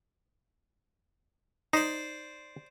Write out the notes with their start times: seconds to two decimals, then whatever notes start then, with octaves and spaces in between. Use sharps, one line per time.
1.73 D#4 C5 D5